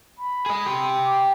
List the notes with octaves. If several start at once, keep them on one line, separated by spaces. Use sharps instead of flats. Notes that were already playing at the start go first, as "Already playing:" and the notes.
B5
G#4 D#5
G4 C6
D6